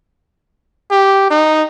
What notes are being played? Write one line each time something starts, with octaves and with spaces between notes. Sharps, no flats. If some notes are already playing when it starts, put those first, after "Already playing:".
G4
D#4